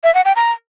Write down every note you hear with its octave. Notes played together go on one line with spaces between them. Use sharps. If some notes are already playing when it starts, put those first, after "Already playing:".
E5
F#5
G5
A#5